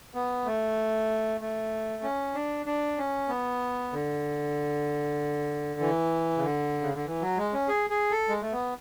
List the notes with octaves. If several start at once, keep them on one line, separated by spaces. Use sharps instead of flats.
B3
A3
A3
C#4
D4
D4
C#4
B3
D3
E3
C#3
D3
C#3
D3
E3
F#3
G#3
C#4
G#4
G#4
A4
G#3
A3
B3